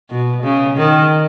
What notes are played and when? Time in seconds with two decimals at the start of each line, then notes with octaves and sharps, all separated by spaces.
0.10 B2
0.43 C#3
0.77 D#3